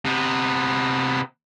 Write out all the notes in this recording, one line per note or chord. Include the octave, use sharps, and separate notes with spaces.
C3 B3